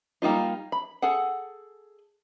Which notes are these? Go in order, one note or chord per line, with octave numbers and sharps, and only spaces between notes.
G3 A#3 D#4 F4
B5
G#4 A4 F#5